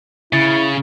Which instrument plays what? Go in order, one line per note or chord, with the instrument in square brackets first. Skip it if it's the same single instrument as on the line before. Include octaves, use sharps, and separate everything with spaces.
[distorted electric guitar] C#3 [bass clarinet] E4 [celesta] A6